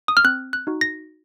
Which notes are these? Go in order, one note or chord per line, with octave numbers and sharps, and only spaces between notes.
D#6
F6
C4 F#6
F#6
D#4 F#4
A#6